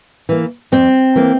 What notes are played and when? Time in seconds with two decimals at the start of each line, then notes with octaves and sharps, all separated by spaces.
0.29 E3 A#3
0.72 F2 C4
1.16 E3 A#3